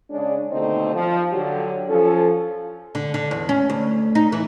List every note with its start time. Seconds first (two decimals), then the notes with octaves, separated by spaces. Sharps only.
0.11 C#3 G#3 C#4 D4
0.52 D#2 B2 D3 A3 C4 D#4
0.95 F3
1.33 D3 F#3 G4
1.88 F3 C#4 A4
2.95 D3
3.14 D3
3.31 E2
3.49 C#4
3.70 D2
4.15 D#4
4.32 E3